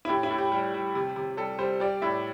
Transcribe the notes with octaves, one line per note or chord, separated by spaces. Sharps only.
E4
A2 G4
E4
A2
G4
G3
G3
C3
C3
G3 A4
G3 C5
G3 D5
A2 E5